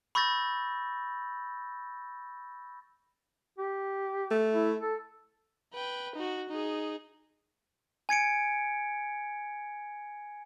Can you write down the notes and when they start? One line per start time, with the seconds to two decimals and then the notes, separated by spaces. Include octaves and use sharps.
0.15 B5 C#6 E6 G6 A6 A#6
3.59 G4
4.31 A3
4.53 E4
4.81 A4
5.73 B4 G5
6.15 D#4 F#4
6.49 D#4 G#4
8.09 G#5 G#6 C#7 D7